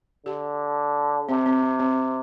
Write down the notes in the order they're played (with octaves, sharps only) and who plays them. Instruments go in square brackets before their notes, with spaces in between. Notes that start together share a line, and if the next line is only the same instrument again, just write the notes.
[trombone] D3 [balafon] G4
[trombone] C3 [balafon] C4
[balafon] C4
C4
C4